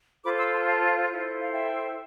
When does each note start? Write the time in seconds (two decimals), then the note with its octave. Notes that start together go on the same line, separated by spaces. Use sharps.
0.24 F4 A4 C5 B5 D6
0.38 C6 E6
0.52 A5 C6
0.67 F5 A5
1.09 E4 A4 C5
1.42 F5
1.51 E5 G5